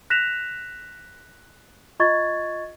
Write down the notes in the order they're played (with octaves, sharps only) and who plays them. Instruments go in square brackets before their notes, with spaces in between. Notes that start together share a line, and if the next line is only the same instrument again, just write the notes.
[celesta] F#6 A#6 B6 E7 F7
F4 D#5 C#6 G#6 A6